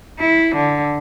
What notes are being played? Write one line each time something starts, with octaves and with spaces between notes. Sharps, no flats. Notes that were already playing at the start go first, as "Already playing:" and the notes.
E4
D3